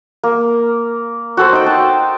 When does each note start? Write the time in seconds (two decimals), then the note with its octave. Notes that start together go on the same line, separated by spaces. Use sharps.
0.23 A#3
1.37 F#4 A4 C5
1.53 D#4 G5
1.66 A5